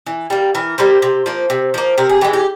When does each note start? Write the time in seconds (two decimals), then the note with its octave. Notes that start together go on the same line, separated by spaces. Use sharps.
0.06 E3
0.30 G3 A#3
0.55 E3 A#4
0.78 G3 A#3 C5
1.02 C3
1.26 F3 A#3
1.50 C3
1.74 F3 A#3
1.98 C3 A#4
2.09 G#4
2.21 E3 G4
2.24 G#3
2.33 G4